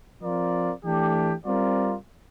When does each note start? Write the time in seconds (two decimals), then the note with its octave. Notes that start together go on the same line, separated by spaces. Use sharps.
0.21 F3 C4 F4 A#4 D5
0.83 E3 A3 D4 G4
1.45 G3 C4 F4 A#4 D5